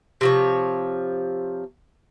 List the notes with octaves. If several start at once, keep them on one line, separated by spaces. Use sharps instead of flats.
C3 F3 C#5